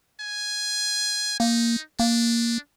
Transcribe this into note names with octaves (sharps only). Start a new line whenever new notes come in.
G#5
A#3 D#4
A#3 D4